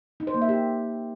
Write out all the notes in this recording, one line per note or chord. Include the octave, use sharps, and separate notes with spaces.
D#4
C5
A#3
E5
G4